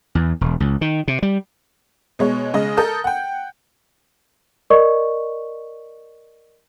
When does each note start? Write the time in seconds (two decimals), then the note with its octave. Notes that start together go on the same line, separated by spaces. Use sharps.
0.15 E2
0.41 E1
0.60 C#2
0.81 D#3
1.08 C3
1.23 G3
2.19 B2 G#3 C#5
2.54 C#3 G#3 D#5
2.77 A4 A#4 D#6 G6
3.04 F#5 G5
4.70 A#4 D5 D#5 C#6